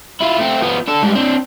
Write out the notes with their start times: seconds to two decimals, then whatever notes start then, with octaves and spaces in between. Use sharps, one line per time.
0.20 E4 F4
0.38 A3 C4
0.62 F3 B3
0.88 D4 A4
1.02 G#2 G3
1.15 C4 D4